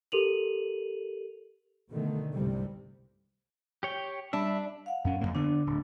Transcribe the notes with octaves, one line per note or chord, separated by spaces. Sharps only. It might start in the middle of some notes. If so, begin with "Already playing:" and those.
G4 A4 A#4 D#7 F7 F#7
B2 D3 D#3 A3
C2 G2 C3 G3
G4 C#5 G5
G3 D4 E5 B5
F5 F#5
F#2 C#4
F2 G#2 A#3
D3 B3 D4
D1